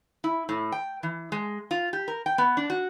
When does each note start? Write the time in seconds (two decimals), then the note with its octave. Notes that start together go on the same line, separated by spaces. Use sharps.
0.24 E4
0.49 A2
0.72 G5
1.03 E3
1.32 G#3
1.71 F4
1.93 G4
2.08 A#4
2.26 G5
2.38 B3
2.57 D4
2.70 F#4